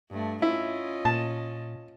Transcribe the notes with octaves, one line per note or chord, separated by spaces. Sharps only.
G2 A3
C#4 E4 F4 D#5
A#2 A5